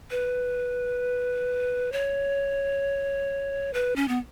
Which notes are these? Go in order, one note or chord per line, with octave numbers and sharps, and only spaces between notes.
B4
C#5
B4
C#4
B3